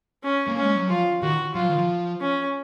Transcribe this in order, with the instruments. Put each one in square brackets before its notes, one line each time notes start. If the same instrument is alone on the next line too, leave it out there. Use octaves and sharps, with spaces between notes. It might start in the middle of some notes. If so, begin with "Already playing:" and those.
[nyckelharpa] C#4
[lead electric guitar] A#3
[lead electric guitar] G#3 [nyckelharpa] C#4
[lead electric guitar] F#3
[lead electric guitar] F3 [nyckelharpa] F4
[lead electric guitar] D#3 [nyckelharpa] F#4
[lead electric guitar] F#3 [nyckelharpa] F4
[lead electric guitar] F3
D#3
F3
[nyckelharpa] C#4